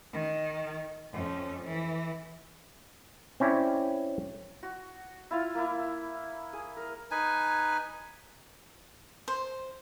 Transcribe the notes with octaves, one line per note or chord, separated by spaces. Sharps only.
D#3
F2 C#4
E3
C4 C#4 E4 C#5 D5
F#4
E4 F4 F5
A#3 E4
G#4
A#4
D#4 B4 G#5
C5